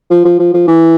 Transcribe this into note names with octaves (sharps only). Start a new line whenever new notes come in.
F3
F3
F3
F3
E3